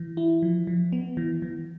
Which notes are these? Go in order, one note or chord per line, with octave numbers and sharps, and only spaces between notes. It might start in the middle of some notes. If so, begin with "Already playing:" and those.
Already playing: E3
E4
F3
F3
B3
E3
E3